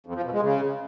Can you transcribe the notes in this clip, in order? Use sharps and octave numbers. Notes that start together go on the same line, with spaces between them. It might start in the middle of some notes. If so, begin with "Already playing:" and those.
F2
F3
B2
G#3
C#3